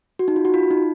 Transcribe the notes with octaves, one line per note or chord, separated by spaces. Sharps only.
F#4
D#4
F4
F#4
F4
D#4